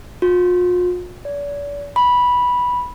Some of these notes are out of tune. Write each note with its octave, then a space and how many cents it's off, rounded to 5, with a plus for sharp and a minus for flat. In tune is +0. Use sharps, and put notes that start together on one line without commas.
F4 +45
D5 -40
B5 -10